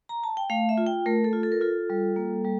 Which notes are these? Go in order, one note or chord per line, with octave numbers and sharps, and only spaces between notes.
A#5
A5
G5
A3 F5
E5
F4
G5
A3 A#4
A4
F4
A4
A#4
F4 A4
G3
A#3
G3